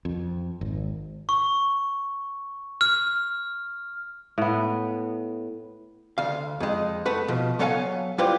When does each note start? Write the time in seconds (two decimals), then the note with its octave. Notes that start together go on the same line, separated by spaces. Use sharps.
0.05 F2
0.61 G#1
1.29 C#6
2.81 F6
4.38 A2 B3
6.18 D2 F5
6.60 F2 G#3
7.06 A3 B4 F#5
7.28 B2 F3
7.59 F#3 B3 A4 C#5 F5 G#5
8.18 G3 E4 F4 G4 B4 C5